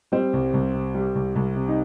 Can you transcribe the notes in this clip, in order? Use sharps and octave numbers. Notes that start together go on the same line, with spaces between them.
G3 C4
C2
C2
C3
G3
C2
C2
C3
D#4